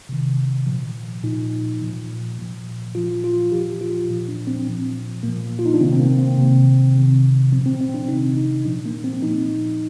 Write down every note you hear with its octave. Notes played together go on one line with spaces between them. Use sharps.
C3 D#3
A#2 F3
A#2 F3 D#4
A#2 F3
A#2 F3
A#2 F3 F4
F4
A#2 F3 G4
F4
A#2 F3
D4
C4
A#2 F3
A#2 F3 A#3
F4
D#4
D4
C3 D#3 C4
C4
A#3
C4
C3 D#3
C3 D#3
A#2 F3 C4
C4
C4
D4
C3 D#3 D#4
D#4
A#2 F3 D4
A#3
C4
A#2 F3 D#4